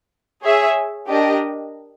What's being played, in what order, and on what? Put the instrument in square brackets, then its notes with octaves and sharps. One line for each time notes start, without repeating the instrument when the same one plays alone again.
[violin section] G#4 C#5 E5
D4 G4 A#4 D#5